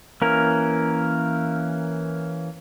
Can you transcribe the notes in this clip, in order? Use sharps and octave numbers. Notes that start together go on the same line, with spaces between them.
E3 A#3 C#4 A#4